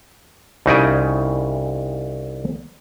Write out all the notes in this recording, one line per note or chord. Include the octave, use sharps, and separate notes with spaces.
C2 C#3 D#4 E4 D5 G#5